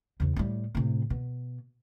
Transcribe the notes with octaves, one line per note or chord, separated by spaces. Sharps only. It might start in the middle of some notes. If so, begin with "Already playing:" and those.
E2 C#3
A2 G3
A2 C3
B2